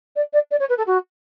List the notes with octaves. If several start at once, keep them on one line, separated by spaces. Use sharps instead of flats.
D5
D5
D5
C#5
B4
A4
F#4